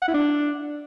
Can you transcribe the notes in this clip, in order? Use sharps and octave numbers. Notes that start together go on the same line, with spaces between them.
F#5
E4
D4